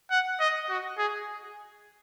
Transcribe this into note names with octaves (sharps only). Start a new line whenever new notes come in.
F#5
D#5
F#4
G#4